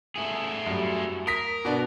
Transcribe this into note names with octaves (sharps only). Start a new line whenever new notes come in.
A3 E4 G#4
F#2 G3
A#4 D#6 A#6 B6
B2 B3 D4